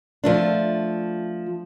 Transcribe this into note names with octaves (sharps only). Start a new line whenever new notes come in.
F3 A3 D4